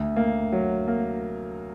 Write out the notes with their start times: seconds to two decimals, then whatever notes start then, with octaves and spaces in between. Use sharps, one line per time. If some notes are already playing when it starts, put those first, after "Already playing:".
Already playing: D2
0.16 A#3
0.52 F#3
0.88 A#3